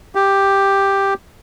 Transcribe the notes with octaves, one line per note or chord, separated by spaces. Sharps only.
G4